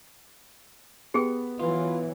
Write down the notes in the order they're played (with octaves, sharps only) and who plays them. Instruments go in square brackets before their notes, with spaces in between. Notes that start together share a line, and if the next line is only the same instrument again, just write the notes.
[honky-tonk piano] B3 [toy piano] G4 G#4 G5
[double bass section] E3 F#3 [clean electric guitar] F4